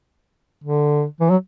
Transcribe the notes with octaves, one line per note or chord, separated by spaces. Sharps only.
D3
E3
F#3